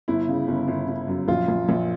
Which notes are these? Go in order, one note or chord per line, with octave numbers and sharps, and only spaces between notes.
G1 E4
C#3
G1
G1
G1
F#2
A#1 F4
A#1
A#1